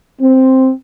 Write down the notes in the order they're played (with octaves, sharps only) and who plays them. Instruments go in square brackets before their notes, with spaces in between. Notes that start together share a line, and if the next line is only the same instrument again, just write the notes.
[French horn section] C4